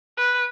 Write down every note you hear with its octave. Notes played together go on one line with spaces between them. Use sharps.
B4